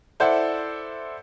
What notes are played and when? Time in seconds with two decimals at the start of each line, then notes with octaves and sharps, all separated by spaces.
0.20 E4 A4 C5 D5 F#5